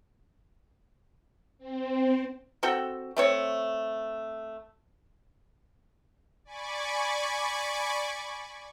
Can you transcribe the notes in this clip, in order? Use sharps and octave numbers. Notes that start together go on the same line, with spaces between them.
C4
C4 F#4 A4 G5
A3 C4 C#5
D5 G#5 B5 C#6 D6